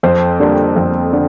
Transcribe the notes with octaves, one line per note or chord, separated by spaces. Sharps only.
F2 C5
D3 G3 A#3
F2
D3